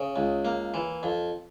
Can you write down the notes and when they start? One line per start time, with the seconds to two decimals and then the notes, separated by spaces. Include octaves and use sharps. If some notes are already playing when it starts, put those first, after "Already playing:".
Already playing: C#3
0.16 C#2
0.45 A#3
0.74 E3
1.03 F2